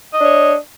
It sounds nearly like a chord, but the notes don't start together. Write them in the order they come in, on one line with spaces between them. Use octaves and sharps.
D#5 D4 C#5